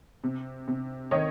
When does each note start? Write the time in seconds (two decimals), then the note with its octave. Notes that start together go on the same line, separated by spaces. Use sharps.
0.24 C3
0.68 C3
1.11 D#3 C#5 D#5